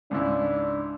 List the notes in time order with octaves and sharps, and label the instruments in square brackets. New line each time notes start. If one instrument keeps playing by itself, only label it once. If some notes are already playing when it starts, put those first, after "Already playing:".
[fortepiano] C#2 G#2 E4 [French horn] D4